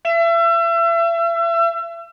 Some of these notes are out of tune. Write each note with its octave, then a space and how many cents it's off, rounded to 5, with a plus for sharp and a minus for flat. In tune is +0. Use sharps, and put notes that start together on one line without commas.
E5 +35